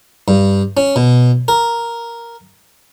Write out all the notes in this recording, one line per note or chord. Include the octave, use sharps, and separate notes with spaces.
G2
C#4
B2
A#4